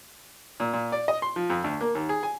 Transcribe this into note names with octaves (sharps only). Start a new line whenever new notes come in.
A#2
A#2
D5
D#5
C6
F3
F2
D2
A#3
D#2
G#4
G#5